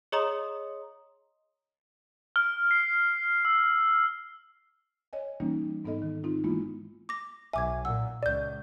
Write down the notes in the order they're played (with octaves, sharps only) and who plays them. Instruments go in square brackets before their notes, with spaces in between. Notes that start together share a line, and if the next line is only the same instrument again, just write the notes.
[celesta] G#4 C#5 D#5 A#5 C6 D#6
[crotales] F6
C7
E6
[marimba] C#5 D#5 G#5
E3 G3 A#3 C#4 D#4
G#2 B3 D#4 A4 D#5
D#3
C4 D#4 F4
E3 G#3 A#3 B3 E4 F4
[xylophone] D6 A#6
[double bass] B1 [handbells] E5 [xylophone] G#5 D6 G#6
[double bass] A#2 [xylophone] F#5 E6
[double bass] C#2 [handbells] D5 G6